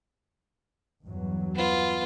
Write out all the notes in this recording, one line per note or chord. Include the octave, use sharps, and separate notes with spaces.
E2 G2 F#3
B3 F4